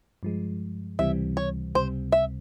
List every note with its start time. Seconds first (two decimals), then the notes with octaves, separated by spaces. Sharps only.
0.23 G2 F3 G#3
0.99 C#2 C3 E3 G3 C4 E5
1.37 C#5
1.75 C#2 C3 G3 C4 C5
2.12 E5